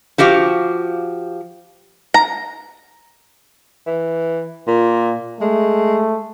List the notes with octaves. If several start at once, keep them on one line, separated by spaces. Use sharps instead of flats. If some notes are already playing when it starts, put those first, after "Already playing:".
F3 F#4 G4 F5
A#5
E3
A#2
G#3 A3